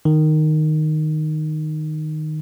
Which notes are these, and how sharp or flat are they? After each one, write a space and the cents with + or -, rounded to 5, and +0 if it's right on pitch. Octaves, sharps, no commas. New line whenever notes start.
D#3 -10